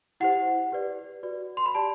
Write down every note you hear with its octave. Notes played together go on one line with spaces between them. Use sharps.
E4 G4 C5 F#5
G4 B4 D5
F#4 B4 D5
C6
B5
G4 D5 A5